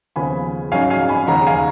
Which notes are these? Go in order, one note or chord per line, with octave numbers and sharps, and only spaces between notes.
D#2 C#3 F3 B3 G#5 B5
G#2 F#3 C#4 F5 G#5
F5 G#5
G#5 B5
D#2 C#3 G#3 F#5 A#5
F5 G#5